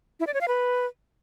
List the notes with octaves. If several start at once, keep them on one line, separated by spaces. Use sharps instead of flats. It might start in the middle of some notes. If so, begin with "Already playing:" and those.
E4
D5
C#5
F5
B4